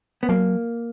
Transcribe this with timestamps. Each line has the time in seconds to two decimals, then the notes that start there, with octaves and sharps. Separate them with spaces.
0.23 B3
0.29 F#3 A#3